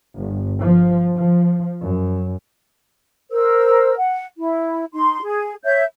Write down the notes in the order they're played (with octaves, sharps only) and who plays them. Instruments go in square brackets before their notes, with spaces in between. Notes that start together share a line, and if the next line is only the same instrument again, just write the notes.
[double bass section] G1
F3
F3
F#2
[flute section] A#4 C5 E6
F#5
E4
D#4 C6
G#4
C#5 E5 G6